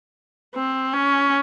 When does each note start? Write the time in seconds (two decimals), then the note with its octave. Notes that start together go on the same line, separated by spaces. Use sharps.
0.55 C4
0.93 C#4